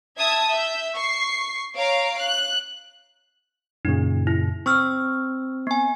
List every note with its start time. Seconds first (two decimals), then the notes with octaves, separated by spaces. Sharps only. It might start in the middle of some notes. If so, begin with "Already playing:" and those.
0.17 E5 A5 D#6 G#6
0.47 E5 G6
0.95 C#6 C7
1.75 C#5 F5 A#5 D7
2.18 F#6
3.85 F#2 A#2 C#3 D#4
4.27 E4
4.66 C4 C#6 E6 F6
5.67 B3 G#5